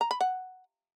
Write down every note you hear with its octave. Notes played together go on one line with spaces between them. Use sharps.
A#5
B5
F#5